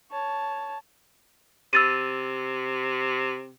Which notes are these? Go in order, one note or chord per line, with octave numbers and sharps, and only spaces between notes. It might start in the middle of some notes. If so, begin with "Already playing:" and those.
C#5 A5
C3 E6 A6 D#7